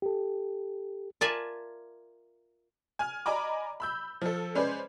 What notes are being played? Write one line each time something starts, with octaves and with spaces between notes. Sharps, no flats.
G4 A4
F4 A#4 D5 E5 G#5 A5
G#5 F6
D5 D#5 G#5 A#5 B5 D6
B5 E6 G6
F3 A4
G#3 C#4 B4 C5 D5